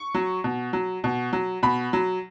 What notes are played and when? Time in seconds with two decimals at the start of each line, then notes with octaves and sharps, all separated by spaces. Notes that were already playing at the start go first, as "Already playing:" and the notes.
Already playing: C#6
0.14 F#3
0.44 B2
0.73 F#3
1.04 B2
1.33 F#3
1.63 B2 B5
1.93 F#3